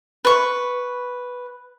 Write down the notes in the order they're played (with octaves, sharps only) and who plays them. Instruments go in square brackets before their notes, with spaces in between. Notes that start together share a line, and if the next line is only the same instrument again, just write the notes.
[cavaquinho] B4 C#6